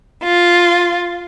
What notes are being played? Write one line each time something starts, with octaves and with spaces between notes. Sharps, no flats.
F4